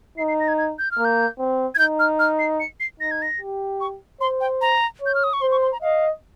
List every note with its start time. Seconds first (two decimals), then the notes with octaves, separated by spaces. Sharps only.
0.18 D#4 C7
0.28 C7
0.40 A#6
0.48 G#6
0.58 G#6
0.79 G6
0.91 F6
0.98 A#3
1.05 G6
1.39 C4
1.75 G#6
1.79 D#4 G6
1.99 F6
2.19 F6
2.39 C7
2.60 C#7
2.80 C7
3.00 D#4 A#6
3.11 G#6
3.22 A#6
3.41 G4
3.80 C#6
4.21 C5 C6
4.41 G5
4.61 A#5
5.01 C#5 G6
5.15 F6
5.24 D#6
5.33 C#6
5.42 C5 C6
5.52 C#6
5.62 C6
5.72 A#5
5.82 D#5 F5